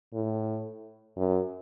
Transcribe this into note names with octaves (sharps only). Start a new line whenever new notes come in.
A2
F#2